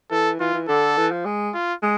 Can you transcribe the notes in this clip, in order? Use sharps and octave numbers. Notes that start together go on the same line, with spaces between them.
E3 A4
E3 F4
E3
D3 A4
E3
F3
G#3
F4
G#3